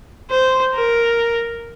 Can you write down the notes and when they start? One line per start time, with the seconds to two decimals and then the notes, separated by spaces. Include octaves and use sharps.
0.30 C5
0.75 A#4